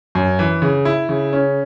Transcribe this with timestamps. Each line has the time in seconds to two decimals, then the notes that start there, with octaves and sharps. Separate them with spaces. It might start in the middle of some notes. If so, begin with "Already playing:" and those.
0.15 F#2
0.39 E3
0.62 C#3
0.85 E4
1.09 C#3
1.33 C#4